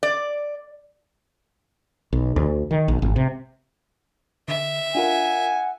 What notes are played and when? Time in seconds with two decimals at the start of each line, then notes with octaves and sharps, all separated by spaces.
0.03 D5
2.13 B1
2.36 D2
2.71 D#3
2.88 A#1
3.02 G#1
3.16 C3
4.48 D3 E5
4.95 D4 F4 A#4 F#5 G#5